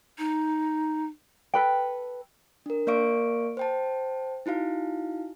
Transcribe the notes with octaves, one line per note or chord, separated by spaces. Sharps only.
D#4
A4 B4 G5
D4 A#4
A#3 A#4 D5 F5 C#6 D7
C5 G5 A5
D#4 E4 F#4 F5